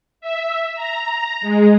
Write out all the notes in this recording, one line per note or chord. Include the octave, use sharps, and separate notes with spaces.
E5
A#5
G#3